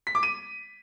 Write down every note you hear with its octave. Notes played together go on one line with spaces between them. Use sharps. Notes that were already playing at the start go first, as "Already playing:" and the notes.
B6
D6
D#7